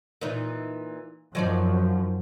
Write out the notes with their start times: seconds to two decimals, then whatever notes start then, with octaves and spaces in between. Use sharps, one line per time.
0.21 A#2 E3 D#4
1.35 F#2 F3 F#3 D#4 D5